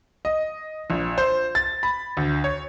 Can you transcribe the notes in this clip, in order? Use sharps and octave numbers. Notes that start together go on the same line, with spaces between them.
D#5
A#1
C5
A6
B5
D2
C#5